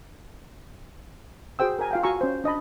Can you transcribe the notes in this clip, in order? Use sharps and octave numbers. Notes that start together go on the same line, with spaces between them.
F#4 G#4 C5 G5 E6
A#4 G#5 A#5
F4 F5 G5
F#4 F5 G#5 A#5 C#6 E6
C#4 C5
D4 D#5 A5 B5